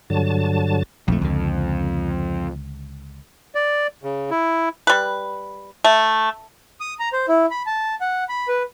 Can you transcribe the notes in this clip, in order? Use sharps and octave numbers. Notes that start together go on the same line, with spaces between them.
G2 D3 F#3 A5
A#1 F2 A3
C#2 D3
D5
C#3
E4
G3 B4
A3
D#6
A#5
C5
E4
B5
A5
F#5
B5
B4